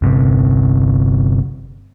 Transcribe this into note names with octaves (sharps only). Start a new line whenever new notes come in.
G1 C3